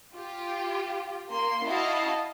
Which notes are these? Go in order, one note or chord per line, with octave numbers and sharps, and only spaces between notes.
F4 G4
A#3 C6
E4 F#4 D#5 F5 A5